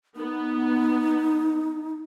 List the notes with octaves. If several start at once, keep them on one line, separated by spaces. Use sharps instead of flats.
B3 D#4